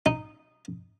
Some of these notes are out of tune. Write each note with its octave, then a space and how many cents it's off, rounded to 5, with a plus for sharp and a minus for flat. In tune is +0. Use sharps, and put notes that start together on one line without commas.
D#4 -10